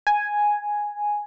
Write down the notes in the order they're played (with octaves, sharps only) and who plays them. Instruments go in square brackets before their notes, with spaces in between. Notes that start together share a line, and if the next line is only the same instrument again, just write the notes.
[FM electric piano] G#5